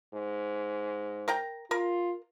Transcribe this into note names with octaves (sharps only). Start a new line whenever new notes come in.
G#2
A#4 G5 A#5
F4 A#4